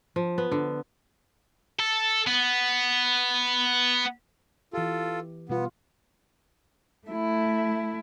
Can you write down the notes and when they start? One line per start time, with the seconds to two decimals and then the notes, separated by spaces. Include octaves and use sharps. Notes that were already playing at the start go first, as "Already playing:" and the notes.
0.16 F3
0.38 B3
0.52 D3
1.80 A4
2.27 B3
4.74 E3 F4 G4 A4
5.49 B2 G3 B3 F4
7.06 A3 E4